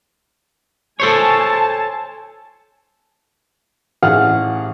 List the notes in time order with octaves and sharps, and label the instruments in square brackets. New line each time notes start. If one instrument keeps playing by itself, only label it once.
[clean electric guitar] A4 C5 C#5 [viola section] G#5 A5
[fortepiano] A1 G#4 F5 F#5 F6